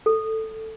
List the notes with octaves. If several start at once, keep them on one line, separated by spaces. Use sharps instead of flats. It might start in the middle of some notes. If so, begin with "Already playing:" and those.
A4